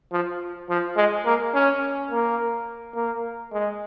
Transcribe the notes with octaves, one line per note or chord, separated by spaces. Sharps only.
F3
F3
G#3
A#3
C#4
A#3
A#3
G#3